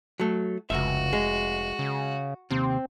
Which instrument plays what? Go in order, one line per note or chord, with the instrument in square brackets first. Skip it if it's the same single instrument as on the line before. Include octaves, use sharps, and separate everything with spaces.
[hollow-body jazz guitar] F#3 A3
[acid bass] F1 [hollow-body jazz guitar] C#2 F#2 E5 [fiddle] F#4
[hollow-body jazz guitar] G#3
[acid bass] C#3
[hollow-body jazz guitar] D#2 C3 [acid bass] C4